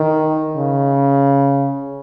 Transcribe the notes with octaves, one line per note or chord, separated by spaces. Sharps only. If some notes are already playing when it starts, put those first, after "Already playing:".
Already playing: D#3
C#3